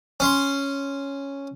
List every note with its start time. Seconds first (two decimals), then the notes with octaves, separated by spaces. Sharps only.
0.20 C#4 C6